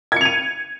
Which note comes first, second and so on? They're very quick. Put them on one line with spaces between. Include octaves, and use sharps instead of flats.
G#6 C#7 F7 D#7